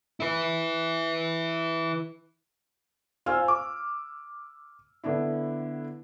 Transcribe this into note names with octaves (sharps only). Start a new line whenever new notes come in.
E4 B4
F4 C5 F5 G#5 E6 F6
D6
D3 B3 D4 E4